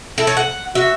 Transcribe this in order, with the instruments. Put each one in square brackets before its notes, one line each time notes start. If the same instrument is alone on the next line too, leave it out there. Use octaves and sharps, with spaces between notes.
[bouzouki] E4 [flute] A4
[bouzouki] C#5
F#5
[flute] F#4 [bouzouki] E5